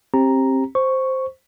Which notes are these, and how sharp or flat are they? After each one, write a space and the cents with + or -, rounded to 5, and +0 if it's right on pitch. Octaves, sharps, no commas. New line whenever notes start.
C4 +25 G4 +0 A#5 +0
C5 +0 C#6 +0